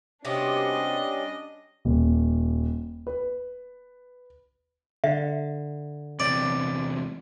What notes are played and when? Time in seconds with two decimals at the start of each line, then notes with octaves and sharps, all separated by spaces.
0.25 C3 G3 B3 C#4 D4 F#4 D5 D#5
1.85 D#1
3.07 B4
5.04 D3 E5
6.20 E2 C3 D5